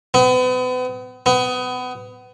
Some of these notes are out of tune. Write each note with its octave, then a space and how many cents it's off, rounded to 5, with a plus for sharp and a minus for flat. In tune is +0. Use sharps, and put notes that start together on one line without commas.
B3 +40
B3 +30